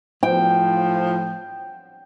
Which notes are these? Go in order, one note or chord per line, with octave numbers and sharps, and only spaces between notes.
A2 F3 G5